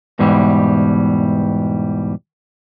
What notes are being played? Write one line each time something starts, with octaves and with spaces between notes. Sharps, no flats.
E2 G#2 B2 E3 G3